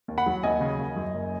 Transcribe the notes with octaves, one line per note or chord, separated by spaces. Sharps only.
D#2
F#5 B5
F#3
D#2 D#5 G#5
C#3
D#2
F#2
F#1